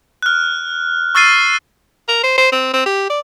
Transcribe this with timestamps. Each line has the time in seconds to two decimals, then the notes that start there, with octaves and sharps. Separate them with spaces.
0.22 F6 F#6
1.15 C#6 E6 F6 A6 C7 D#7
2.09 A#4
2.24 C5
2.38 C5
2.52 C4
2.74 C4
2.86 G4
3.10 D5